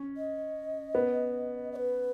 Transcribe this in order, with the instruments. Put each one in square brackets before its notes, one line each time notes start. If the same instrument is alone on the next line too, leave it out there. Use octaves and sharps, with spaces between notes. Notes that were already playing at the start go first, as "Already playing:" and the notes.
Already playing: [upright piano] C#4
[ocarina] D#5
[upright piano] B3
[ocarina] D#5
B4